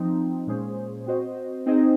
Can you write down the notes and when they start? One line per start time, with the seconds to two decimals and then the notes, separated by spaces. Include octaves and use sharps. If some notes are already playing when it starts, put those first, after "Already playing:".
Already playing: F3 C4 D#4
0.47 A#2 G#3 C#4 G#4 C5
1.06 C4 F#4 C5 D#5
1.66 C4 D#4 G#4 C5 D#5